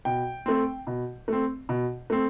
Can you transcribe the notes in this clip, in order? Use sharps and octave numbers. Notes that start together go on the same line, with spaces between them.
B2 G5
A3 C4
B2
A3 C4
B2
A3 C4